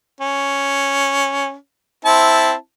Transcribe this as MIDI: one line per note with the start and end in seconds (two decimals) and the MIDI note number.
0.21 1.54 61
2.05 2.53 60
2.05 2.53 64
2.05 2.53 81